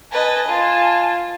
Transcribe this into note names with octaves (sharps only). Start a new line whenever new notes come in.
B4 D#5 G#5 A5
F4